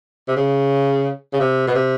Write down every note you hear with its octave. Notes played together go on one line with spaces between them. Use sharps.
C3
C#3
C#3
C3
B2
C3